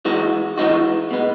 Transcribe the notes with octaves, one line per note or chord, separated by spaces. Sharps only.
E3 G#3 D#4 F#4
E3 G#3 D#4 F#4
B2 G#3 B3